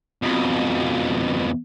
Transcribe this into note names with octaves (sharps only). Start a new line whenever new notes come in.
F2 B2